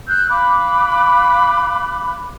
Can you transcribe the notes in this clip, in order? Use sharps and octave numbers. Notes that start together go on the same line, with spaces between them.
E6 F#6 G6
F5 B5 D6 F#6